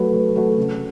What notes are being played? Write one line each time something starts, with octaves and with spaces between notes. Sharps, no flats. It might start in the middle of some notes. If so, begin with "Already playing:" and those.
Already playing: F#3 A3 F#4 B4
F#3
A3 F#4 B4
C#3